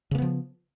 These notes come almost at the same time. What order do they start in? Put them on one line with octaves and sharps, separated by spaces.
C#3 A#3 B3 F3